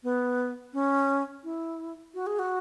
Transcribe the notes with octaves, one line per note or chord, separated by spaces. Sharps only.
B3
C#4
E4
F#4
G#4
F#4